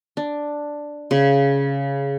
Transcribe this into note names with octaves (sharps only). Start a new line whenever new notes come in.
D4
C#3